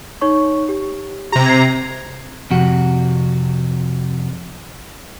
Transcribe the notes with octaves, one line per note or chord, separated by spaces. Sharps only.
D#4 C#5 C#6
G4
C3 G4 A#5
G#6 C7
F2 C3 F#4